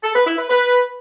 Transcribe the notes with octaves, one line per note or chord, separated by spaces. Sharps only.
A4
B4
E4
B4
B4